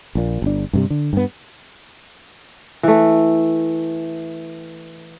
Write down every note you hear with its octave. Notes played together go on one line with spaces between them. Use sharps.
A#1 A#2
G1 D4
G2 C3 G3
D3
G2 B3
E3 A3